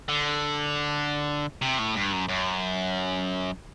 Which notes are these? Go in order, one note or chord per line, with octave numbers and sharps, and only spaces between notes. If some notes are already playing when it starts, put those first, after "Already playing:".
D3
C3
A2
G2
F#2
F#2